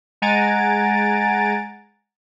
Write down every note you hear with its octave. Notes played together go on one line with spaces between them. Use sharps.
G#3 F#5 G#5 A#5 A6 D7